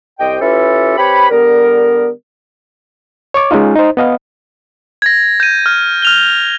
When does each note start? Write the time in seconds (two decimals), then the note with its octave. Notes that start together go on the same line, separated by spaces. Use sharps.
0.20 C2 G4 C5 D#5 G5
0.41 C#4 E4 F4 G4 A4 B4
0.97 C4 G4 B4 C#5 B5
1.30 D3 G3 B3 A#4
3.34 C#5 C#6 D6
3.51 G#3 C#4 D#4 F4
3.76 D#4 C5
3.97 B3 D#5 F5
5.02 G#6 A#6
5.40 G6 D#7
5.66 F6
6.02 F6 F7 G7